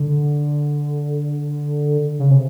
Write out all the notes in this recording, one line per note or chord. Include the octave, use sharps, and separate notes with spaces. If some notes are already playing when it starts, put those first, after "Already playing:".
Already playing: D3
C#3
C3